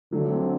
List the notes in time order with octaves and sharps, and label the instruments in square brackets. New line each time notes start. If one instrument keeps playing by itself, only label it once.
[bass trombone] D3 [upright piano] F#3 A3
[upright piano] A3 C4